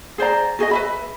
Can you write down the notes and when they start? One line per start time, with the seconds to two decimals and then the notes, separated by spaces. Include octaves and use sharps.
0.18 G#4 C5 D5 A#5
0.59 F#4 G#4 C5 D#5
0.71 B4 E5 B5